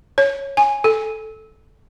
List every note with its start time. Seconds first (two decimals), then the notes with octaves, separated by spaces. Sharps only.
0.18 C#5
0.57 G#5
0.84 A4